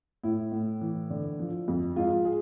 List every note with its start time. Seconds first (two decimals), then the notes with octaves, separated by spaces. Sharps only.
0.24 A2 E4
0.52 A2
0.81 E3
1.10 D3
1.39 F3
1.68 F2
1.96 G#2 F4
2.25 G#4